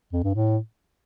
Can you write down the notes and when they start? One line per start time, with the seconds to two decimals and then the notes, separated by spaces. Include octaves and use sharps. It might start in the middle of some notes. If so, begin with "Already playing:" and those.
0.13 F2
0.24 G2
0.35 A2